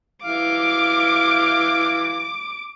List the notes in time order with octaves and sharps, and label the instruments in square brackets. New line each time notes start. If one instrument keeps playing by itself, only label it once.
[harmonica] E3 F5 [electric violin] D6